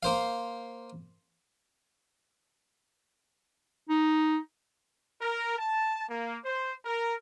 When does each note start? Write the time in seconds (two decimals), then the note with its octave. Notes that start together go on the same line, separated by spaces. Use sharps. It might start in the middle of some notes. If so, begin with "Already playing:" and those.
0.03 A#3 C5 F5
3.89 D#4
5.21 A#4
5.59 A5
6.10 A#3
6.45 C5
6.85 A#4